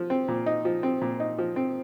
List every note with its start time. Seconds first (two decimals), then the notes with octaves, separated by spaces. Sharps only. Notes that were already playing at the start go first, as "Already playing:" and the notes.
Already playing: F3
0.10 C4
0.28 A#2
0.46 D#4
0.65 F3
0.83 C4
1.01 A#2
1.20 D#4
1.39 F3
1.56 C4